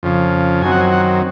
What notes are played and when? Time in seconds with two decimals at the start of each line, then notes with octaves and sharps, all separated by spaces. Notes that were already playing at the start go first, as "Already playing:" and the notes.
0.03 F2 C#3 F3
0.62 F#2 D#3 F#3 C4 G#5
0.72 F#5
0.81 G#5
0.92 F#5